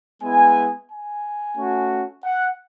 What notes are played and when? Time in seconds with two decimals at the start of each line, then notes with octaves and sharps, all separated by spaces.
0.22 G#3 B3 E4 G#5
0.90 G#5
1.56 A3 C#4 F#4
2.24 F#5